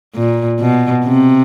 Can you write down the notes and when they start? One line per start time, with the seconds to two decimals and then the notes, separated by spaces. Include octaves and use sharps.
0.15 A#2
0.60 B2
1.05 C3